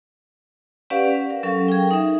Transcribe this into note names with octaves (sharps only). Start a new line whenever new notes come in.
C#4 G4 B4 D5 F5 F#5
F5
A#4
F#3 C#4 A4 F5 C#6
G#4 A#4 G5
D#4 E5